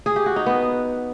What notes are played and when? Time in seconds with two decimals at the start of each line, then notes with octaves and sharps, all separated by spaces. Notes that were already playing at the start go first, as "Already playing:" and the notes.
0.06 G#4
0.16 G4
0.26 F#4
0.36 D#4
0.46 B3